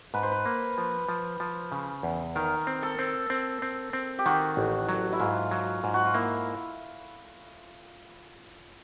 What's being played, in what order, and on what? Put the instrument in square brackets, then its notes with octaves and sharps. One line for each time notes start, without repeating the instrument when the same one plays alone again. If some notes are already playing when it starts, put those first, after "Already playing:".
[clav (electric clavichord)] G#2 [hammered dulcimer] B4
[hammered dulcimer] C5
B4
[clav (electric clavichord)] A#3
F3
F3
F3
C#3
E2
[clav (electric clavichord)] D#3 [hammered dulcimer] A#4
[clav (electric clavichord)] C4
[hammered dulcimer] A4
[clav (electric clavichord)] C4
C4
C4
C4
[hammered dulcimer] G4
[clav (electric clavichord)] D#3 [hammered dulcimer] F#4
[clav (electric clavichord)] A1
F#3
[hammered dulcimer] E4
[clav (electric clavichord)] G#2 [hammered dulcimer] F4
[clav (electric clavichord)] F#3
G#2
[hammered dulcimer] F#4
F4
[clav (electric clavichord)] A#3 [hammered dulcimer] E4